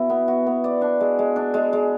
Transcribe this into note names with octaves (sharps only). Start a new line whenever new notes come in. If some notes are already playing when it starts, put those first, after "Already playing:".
Already playing: B2 E4 F#4
B3
F#4
B3
D5
D4
G#3
G#3
D4
G#3
G#3